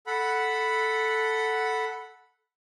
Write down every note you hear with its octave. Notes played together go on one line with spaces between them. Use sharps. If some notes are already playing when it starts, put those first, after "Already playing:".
A4 F#5 B5